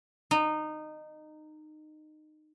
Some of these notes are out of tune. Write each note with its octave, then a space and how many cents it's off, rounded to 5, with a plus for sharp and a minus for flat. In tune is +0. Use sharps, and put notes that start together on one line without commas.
D#4 -20